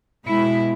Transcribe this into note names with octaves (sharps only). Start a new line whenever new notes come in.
B2 G#3 E4